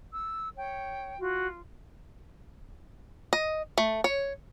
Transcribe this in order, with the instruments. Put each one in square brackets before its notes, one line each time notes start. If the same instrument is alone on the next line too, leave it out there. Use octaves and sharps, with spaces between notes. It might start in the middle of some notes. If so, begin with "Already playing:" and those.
[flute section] E6
C#5 G5
[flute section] F4 [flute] F#4
[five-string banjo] D#5
A3
C#5